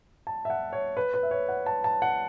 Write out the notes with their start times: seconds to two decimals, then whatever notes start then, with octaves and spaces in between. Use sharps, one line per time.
0.27 A5
0.45 E5
0.50 F#5
0.73 C#5
0.97 B4
1.14 B4
1.23 E5
1.31 C#5
1.49 F#5
1.66 A5
1.84 A5
2.02 F#5